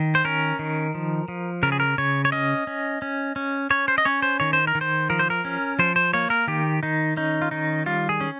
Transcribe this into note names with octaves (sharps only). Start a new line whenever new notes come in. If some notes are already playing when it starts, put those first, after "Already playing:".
Already playing: D#3
C5
C#4 A#4
D#3
F3
F3
C#3 A#4
G#4
A#4
C#3 C#5
C#5
C#4 D#5
C#4
C#4
C#4
C#4 C#5
C5
D#5
C#4 C#5
C5
D#3 C#5
C5
A#4
D#3
C5
F3 A#4
C5
A#4
C#4
F3 C5
C5
A#3 C#5
A#4
D#3 G4
D#3 D#4
C#4 D#4
F4
D#3 D#4
G3 F4
G#4
C#4